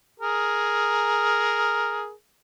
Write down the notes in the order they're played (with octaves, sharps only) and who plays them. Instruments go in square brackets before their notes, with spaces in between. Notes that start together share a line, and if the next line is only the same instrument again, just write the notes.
[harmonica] G#4 A#4